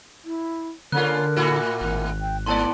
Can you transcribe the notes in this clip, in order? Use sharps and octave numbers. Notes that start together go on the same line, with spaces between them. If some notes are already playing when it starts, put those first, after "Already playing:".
E4
D3 A#3 C#4 F4 A#4 F#6
A2 E4 F#4
G#1
G5
G#2 B3 D5 A5 C6